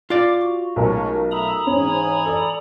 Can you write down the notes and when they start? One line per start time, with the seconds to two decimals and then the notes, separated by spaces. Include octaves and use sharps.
0.10 F4 D5 D6
0.41 F#4
0.76 B1 G#3 A3 C#4 A#4 A5
1.32 A3 E5 A#5 B5 D#6
1.67 G#2 E3 C4 C#4 G#5
2.26 A4 D5